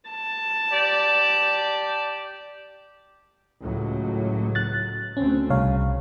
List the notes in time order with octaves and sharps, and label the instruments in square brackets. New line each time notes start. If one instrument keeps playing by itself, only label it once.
[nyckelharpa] A5
[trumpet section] G4 D5
[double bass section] C#2 A2 F#3
[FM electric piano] F#6 A6
[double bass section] D2 C4 [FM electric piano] C#4
[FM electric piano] C2 C#5 F5 [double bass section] C#3